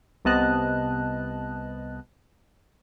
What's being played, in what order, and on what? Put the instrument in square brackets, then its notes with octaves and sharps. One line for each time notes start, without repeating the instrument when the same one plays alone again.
[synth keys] C2 C3 B3 D#5 A5 F#6